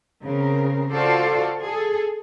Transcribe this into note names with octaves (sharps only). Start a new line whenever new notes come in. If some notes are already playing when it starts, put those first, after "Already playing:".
C#3 C4 A#4
F4 F#4 A4 C5 D5 F5
G#4 A4